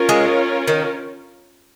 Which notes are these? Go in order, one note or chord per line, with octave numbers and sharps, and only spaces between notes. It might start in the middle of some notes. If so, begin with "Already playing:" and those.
Already playing: C#4 F4 A#4 C#5
G#3
D#3